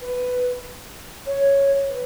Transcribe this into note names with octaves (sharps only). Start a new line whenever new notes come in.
B4
C#5
B4